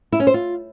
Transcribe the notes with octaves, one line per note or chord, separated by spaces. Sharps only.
E4
C#4
C5
F4